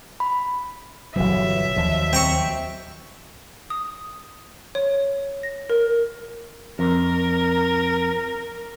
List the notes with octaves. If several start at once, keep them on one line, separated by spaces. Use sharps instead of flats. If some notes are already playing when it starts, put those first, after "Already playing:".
B5
G1 B2 E3 F#3 E5
D#2 F3
C4 A#5 C#6
D#6
C#5
A#6
A#4
F2 A#4